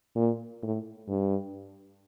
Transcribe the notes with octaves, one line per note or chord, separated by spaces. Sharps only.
A#2
A2
G2